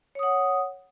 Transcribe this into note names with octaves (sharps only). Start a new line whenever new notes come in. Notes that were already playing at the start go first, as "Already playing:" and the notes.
C#5 F#5 D#6